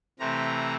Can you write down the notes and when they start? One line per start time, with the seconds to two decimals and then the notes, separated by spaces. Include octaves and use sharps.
0.19 C3 E3 A3 C4 A#5